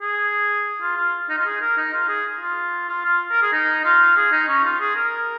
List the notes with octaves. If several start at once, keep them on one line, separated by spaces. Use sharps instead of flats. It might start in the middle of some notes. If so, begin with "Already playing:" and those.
G#4
F4
F4
D#4
F4
G#4
A#4
D#4
F4
G#4
F4
F4
F4
A#4
G#4
D#4
F4
G#4
D#4
C#4
F4
G#4
A#4